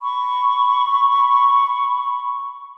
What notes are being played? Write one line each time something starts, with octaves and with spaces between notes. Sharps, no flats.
B5 C#6